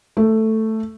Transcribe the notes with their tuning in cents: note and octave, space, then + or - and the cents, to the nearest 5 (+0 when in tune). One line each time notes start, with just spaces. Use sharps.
A3 +5